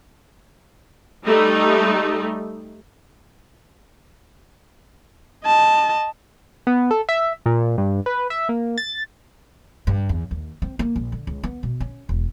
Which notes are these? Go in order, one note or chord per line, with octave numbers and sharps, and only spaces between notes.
G3 A3 D#4
D#5 A5
B3
A4
E5
A#2
G2
B4
E5
A#3
A6
G2
E2
D#2
C4
A#3
A#1
D3
C#2
B3
B2
C#4
E1